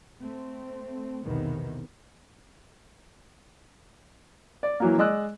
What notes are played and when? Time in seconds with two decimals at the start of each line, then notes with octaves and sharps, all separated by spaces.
0.19 A3 C4
1.23 B1 E2 C3 D#3 E3 B3
4.63 D5
4.80 E3 F#3 A#3
4.98 G#3 D5 D#5 E6 F#6